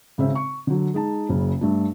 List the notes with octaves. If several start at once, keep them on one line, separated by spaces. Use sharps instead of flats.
G#1 C#3 C4 E5
C#6
D3 F#3
G#3 D#4 A5
F#1 C#3
G2 A3 D4